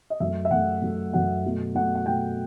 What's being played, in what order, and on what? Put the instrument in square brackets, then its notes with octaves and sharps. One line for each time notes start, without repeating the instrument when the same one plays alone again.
[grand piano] D#5
F#2 F#3 A3 E5
E5
F#2 F#3 A3 F#5
F#2 F#3 A3
F#2 F#3 A3 F#5
B2 F#3 A3
B2 F#3 A3 F#5
F#5
B2 F#3 A3 G5